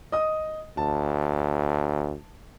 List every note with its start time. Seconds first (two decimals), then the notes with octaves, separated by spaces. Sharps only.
0.12 D#5 D#6
0.77 D2 A5